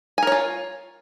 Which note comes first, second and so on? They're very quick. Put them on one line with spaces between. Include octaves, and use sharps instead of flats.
G#5 A#4 C#5 F4